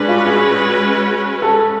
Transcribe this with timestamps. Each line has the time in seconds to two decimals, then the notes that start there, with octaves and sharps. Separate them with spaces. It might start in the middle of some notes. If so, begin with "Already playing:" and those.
Already playing: G#3 C#4 D4 F#4 B4
0.08 F4
0.27 G#4
1.42 A4